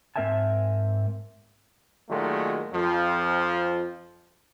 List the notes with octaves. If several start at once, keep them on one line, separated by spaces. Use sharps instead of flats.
G#2 C4 A#4 E5 G#5 A5
A#2 D#3 F#3 G#3 A3 F#4
F2 F3